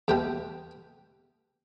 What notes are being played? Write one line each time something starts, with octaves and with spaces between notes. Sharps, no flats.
E2 B2 G3 G4 G5